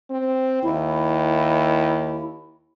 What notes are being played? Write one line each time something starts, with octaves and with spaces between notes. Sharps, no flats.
C4
D#2 E4